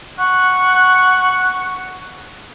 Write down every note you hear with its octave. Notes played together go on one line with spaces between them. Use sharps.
F#5 C#6 F#6